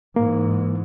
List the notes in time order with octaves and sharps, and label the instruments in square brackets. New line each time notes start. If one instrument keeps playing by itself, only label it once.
[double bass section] G#2 E3 [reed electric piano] A#3